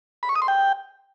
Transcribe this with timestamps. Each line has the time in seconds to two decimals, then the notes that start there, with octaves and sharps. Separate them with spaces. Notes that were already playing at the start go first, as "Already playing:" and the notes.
0.23 B5
0.29 C#6
0.35 D#6
0.42 C6
0.48 G5